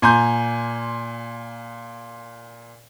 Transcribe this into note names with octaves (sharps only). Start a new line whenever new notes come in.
A#2 G#5 A#5 C6 G6